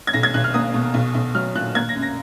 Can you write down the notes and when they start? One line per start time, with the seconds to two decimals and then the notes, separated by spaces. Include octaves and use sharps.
0.07 G#6
0.13 B1 A#6
0.23 G#6
0.34 B1 F#6
0.44 F6
0.54 A#3 D#6
0.74 B2
0.94 B1
1.14 B1
1.35 F#3 F6
1.55 A#2 F#6
1.75 A#3 G#6
1.89 A#6
1.96 F#2
2.02 A#6